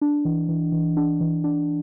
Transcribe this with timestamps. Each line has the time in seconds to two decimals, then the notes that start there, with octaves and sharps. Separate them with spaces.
0.01 D4
0.25 E3
0.49 E3
0.72 E3
0.97 D4
1.21 E3
1.44 D4